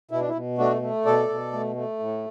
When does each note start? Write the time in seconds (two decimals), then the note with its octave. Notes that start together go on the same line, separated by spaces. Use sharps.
0.11 B2 E4
0.20 D4
0.29 E4
0.35 B2
0.58 A3 D4 F#4
0.82 A3
1.05 B2 A4 D5
1.29 B2
1.52 A3
1.76 A3
1.99 A2